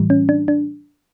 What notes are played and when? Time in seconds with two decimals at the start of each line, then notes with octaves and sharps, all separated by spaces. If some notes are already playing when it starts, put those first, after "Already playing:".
Already playing: A2 E3 G3
0.10 C#4
0.29 D4
0.48 D4